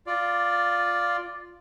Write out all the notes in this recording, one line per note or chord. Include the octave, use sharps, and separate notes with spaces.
F4 D5